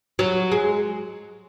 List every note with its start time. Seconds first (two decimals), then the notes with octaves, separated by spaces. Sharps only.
0.19 F#3
0.52 G#3